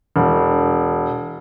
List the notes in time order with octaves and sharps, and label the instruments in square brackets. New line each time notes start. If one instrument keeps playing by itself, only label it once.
[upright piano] E1